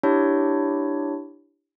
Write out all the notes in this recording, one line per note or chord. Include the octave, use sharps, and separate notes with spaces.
D4 E4 G4 C#5